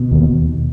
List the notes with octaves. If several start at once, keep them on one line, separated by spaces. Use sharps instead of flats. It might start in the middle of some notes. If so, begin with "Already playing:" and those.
Already playing: B2
D#2